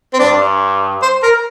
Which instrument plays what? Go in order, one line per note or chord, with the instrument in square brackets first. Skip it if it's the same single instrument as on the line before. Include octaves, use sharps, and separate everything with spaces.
[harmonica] C4
[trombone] G2 [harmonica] D4
[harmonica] C5
A#4